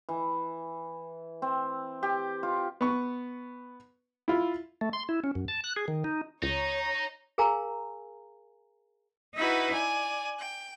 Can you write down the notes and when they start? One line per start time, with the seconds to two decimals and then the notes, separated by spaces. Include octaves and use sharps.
0.09 E3
1.42 C4
2.03 G4
2.43 F4
2.81 B3 C#6
4.28 E4 F4
4.81 A3
4.93 C6
5.09 E4
5.24 C#4
5.35 F#2
5.48 A5
5.64 F#6
5.76 G#4
5.88 D#3
6.04 D#4
6.43 C#2 D#4 C#5 A#5
7.38 G#4 A#4 F5 G#5 A#5 C6
9.36 D#4 E4 F#4 B4
9.72 D5 G#5
10.39 G5